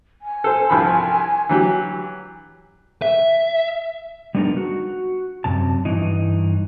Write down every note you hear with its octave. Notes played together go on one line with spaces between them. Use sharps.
G#5
A4 C5
C2 F3 B5
E3 F#3 G4
E5
G3 G#3 B3 D4 D#4 A#4
F#4
F#2 C3 A5
G2 E3 D#4